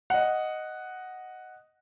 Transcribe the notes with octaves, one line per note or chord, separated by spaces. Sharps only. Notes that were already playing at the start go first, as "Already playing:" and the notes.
D#5 F#5